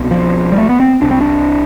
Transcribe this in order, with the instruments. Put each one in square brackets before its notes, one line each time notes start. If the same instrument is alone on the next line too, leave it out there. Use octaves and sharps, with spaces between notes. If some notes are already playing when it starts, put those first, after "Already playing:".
Already playing: [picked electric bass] C2 B2
F3
G3
A3
B3
C4
C2 C3 D4
C4
D4